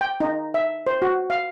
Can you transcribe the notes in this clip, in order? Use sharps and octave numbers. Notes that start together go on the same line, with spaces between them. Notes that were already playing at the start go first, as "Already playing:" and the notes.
G5
D#4
E5
C5
F#4
F5